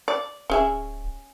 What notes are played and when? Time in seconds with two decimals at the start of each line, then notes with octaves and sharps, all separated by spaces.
0.08 D5
0.50 D1 C#4 G#4 E5